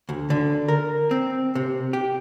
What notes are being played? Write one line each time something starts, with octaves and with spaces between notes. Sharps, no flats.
D2
D3
A#4
C4
C3
G4